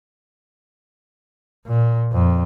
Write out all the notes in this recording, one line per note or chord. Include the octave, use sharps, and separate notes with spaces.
A#2
F2